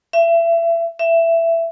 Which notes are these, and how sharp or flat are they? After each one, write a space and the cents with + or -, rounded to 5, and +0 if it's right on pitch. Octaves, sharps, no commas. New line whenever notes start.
E5 +30
E5 +15